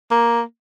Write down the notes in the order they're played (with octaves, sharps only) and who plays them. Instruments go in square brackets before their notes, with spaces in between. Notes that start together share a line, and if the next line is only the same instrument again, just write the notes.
[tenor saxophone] A#3